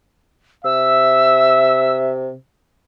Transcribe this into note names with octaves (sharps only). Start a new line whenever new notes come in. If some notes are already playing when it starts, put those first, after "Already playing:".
C3 E5 E6